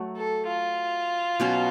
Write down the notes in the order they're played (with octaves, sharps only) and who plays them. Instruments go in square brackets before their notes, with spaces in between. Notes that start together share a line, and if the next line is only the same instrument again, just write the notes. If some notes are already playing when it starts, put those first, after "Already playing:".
Already playing: [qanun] F#3 A3
[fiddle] A4
F4
[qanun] B2 F#3 C#4 F#4